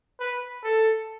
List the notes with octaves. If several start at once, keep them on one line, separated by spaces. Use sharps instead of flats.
B4
A4